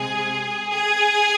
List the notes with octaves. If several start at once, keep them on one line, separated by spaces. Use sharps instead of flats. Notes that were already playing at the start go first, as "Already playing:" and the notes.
Already playing: C3 G#3 G#4
G#4